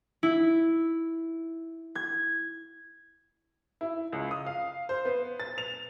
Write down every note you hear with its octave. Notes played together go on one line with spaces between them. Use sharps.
E4
G#6
E4
C#2
D#6
F5
C5
B3
A6
F7